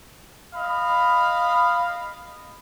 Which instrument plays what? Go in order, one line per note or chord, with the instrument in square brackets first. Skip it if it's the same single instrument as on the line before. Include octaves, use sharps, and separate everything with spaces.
[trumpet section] D#5 F5 B5